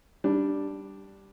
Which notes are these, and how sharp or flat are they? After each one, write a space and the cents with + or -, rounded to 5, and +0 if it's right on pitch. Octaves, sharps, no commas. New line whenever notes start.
G3 +0 D4 +0